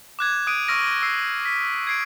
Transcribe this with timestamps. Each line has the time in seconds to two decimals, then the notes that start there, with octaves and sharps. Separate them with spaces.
0.19 D6 F#6 G#6
0.47 D#6 F#6 D7 D#7
0.68 C#6 E6 F6 A#6 D7 D#7
1.02 E6 C7
1.45 B6
1.87 G#6 C7 D7